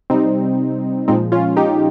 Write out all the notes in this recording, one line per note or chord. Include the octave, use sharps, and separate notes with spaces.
C3 G3 C4 D#4
A#2 F3 G#3 C4 D#4
C#4 F4
D#4 G4